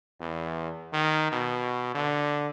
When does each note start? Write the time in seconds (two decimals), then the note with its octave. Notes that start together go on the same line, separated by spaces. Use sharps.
0.21 E2
0.93 D#3
1.32 B2
1.95 D3